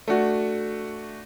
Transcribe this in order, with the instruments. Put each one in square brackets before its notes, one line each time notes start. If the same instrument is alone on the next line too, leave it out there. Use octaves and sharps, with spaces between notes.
[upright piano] A3 D4 F#4